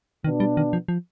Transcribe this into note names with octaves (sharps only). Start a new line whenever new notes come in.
B2 D#3 B3 D4
G3
D#3
F3
F3